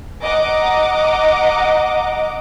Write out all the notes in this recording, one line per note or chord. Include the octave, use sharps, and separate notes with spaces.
D#5 F#5 A#5 D6